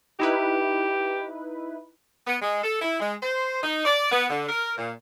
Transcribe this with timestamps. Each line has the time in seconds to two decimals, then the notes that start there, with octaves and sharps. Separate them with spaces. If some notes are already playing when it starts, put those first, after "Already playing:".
0.20 D#4 E4 G4 B4
2.27 B3
2.42 G#3
2.64 A4
2.82 E4
3.00 G#3
3.23 C5
3.63 D#4
3.85 D5
4.12 B3
4.30 D3
4.49 A#4
4.77 A#2